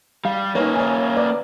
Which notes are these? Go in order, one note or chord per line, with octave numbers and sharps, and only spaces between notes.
G3 F5
A#3 C#4 D#4 B4 C#5
C#5 G#5
B4 D5